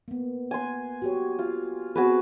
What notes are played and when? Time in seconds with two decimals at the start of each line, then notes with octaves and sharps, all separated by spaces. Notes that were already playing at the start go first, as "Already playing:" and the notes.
0.08 A#3 B3
0.51 A#3 F#5 G#5 C6
1.02 F#4 G4 C#5
1.39 F4
1.95 B3 C4 F#4 G#4 B4